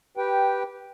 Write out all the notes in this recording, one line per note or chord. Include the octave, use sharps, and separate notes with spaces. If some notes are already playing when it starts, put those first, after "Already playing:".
G4 B4 G5